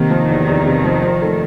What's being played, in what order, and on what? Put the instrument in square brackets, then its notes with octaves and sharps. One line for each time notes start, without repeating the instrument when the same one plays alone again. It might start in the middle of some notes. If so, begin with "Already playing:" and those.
Already playing: [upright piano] C3 A#3 [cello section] D#3
[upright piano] F3
E2
E2
C3
F3
F3
A3